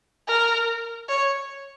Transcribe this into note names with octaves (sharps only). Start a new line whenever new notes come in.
A#4
C#5